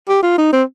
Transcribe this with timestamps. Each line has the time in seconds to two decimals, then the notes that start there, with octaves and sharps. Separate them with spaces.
0.08 G4
0.23 F4
0.38 D#4
0.52 C4